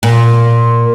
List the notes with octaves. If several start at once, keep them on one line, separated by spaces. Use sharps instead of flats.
A#2